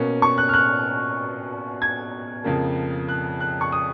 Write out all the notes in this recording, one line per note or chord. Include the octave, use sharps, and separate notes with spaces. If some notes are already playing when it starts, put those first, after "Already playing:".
Already playing: B2 A#3 C#4
C#6
F#6
F6
F#6
G#6
F2 C#3 F3 A#3
F#6
F#6
C#6
D#6